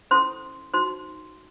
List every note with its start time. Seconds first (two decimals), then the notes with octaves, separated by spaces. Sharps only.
0.11 C#4 E4 A4 C5 C6
0.74 D#4 F#4 C5 C6